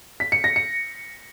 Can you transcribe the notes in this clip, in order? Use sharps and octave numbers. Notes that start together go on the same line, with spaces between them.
B6
C#7
A#6
C#7